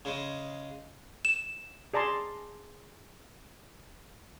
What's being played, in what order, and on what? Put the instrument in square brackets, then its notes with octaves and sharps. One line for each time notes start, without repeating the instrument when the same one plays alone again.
[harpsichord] C#3 G#3
[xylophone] E7
[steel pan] G#4 D5 A5 A#5 C6